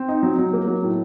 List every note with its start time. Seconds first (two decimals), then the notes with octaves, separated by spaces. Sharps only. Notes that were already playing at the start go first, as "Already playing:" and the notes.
Already playing: C4
0.08 D#4
0.23 F#3
0.38 F#3
0.53 A#3
0.67 F#3
0.83 A2